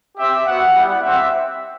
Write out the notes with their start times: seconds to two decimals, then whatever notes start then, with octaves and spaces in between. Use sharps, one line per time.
0.18 C4 G4 E5
0.46 B3 F#4 F#5
0.74 G3 B3 E4 G4 F#5
1.02 C4 G4 E5